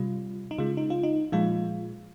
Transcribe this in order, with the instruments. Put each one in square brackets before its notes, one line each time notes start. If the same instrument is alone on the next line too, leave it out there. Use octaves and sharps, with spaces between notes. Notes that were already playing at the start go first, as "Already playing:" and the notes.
Already playing: [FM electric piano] C3 G3 F4
D#4
C#3 G#3 F4
D#4
F4
D#4
A#2 F3 G#3 F4